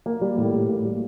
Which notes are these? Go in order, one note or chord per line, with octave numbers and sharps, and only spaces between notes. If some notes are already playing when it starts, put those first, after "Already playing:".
A#3
G3
A2
A2
A#3
G3